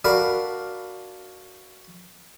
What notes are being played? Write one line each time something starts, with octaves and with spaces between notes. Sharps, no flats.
D4 F#4 A#4 F5 B5